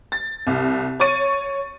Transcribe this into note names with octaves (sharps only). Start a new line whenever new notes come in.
A6
C2
C#5 C#6 A6 D#7